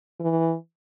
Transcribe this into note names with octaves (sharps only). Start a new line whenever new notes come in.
E3